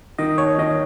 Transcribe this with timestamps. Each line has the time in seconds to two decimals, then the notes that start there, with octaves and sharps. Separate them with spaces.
0.18 D#3 D#5
0.38 D#2 C#5
0.58 D#3 D#5